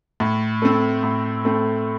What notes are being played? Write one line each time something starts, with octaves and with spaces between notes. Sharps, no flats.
A2
A3 C4
A2
A3 C4